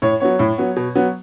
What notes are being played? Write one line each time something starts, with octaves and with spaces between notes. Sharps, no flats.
A2 C#5
F#3 B3 C#5
A2
F#3 B3
B2
F#3 B3